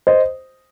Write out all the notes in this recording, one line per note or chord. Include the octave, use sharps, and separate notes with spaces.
C5 D#5